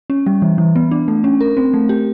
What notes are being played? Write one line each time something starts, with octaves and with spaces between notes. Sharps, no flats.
C#4
G3
E3
E3
B3
D4
A3
C#4
A#4
C4
A3
G4